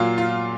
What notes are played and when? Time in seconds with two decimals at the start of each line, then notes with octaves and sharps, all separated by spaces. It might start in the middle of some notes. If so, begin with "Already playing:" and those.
Already playing: A#2 F#3 F4
0.18 F4